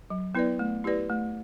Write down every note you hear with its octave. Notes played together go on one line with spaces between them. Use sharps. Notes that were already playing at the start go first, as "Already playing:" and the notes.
F#3
B3 E4 B4 D5
A3
E4 G4 B4 D5
A3